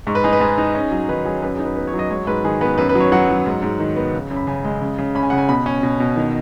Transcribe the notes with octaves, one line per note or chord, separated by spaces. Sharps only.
G#2 C#6
B4
D#4 G#4
B4
G#2 G#4
D#4
C#4
F#3
D#3 B4
F#3 G#4
F#2 B4
G#4
D#4
B4
B3 B4
C#5
F#3
D#5
G#3 C#5
G#2 B4
D#3 G#4
B3 B4
F#2 B4
B4
F#3
C#5
F#3 F#5
F#3
G#2
G#2
D#3
B3
C#3
F#2
B5
C#3 G#5
G#3
C#3
C#3
C#4 B5
G#5
C#3 F#5
G#5
B2 B5
C#4
B2
B2
D#3